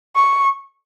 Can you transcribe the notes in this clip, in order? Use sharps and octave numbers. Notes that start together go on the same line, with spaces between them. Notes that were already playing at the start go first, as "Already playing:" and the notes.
C#6